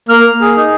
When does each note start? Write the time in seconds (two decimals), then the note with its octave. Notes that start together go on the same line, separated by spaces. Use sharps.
0.09 A#3 F6
0.25 A#3
0.41 G#4
0.56 D#4